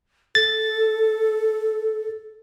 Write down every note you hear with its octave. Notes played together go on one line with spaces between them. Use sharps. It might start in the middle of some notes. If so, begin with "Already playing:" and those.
A4 A6